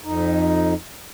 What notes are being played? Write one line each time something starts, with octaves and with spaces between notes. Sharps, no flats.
F2 D#4